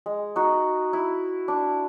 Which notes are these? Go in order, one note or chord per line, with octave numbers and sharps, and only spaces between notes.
G#3
D#4 F#4
E4
D4